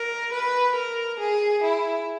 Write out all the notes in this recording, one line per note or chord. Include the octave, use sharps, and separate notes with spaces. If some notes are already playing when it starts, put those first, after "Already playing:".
Already playing: A#4
B4
A#4
G#4
E4